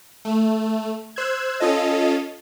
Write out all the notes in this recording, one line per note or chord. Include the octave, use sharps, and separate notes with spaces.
A3
C5 E6 F#6 G#6
C#4 F4 A4 D#5